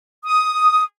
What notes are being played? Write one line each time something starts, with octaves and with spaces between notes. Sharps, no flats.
D#6